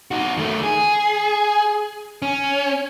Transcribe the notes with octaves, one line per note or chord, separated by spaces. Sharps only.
D#4 F#4
D#3 A3
G#4
C#4